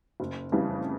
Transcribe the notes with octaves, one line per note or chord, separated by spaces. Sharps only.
F#1
F2 C#3 E3 G3